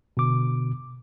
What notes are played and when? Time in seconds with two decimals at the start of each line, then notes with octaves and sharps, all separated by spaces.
0.17 B2 D3 D6